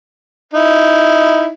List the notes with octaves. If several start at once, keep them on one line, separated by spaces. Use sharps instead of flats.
D#4 E4